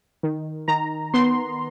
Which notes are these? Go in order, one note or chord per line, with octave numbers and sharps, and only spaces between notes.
D#3
D#3 A#5
B3 C6